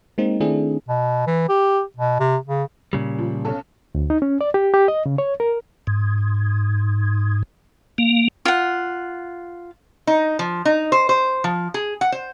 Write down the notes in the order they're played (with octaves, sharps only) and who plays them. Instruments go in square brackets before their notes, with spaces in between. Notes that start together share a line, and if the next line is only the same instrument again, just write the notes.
[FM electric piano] G#3 A#3 C4 D#4
D#3 A3 C4 D4 E4 G#4
[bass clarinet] B2
E3
G4
B2
C3
C#3
[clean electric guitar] A#2 C#3 G3
[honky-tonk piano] F3
B1 C#4 A4
[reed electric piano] D2
D#4
C#4
D5
G4
G4
D#5
C#3
C#5
A#4
[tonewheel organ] G#2
A#3
[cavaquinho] F4 F#5
[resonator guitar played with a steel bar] D#4
F3
D#4
C5
C5
F3
G#4
F#5
C5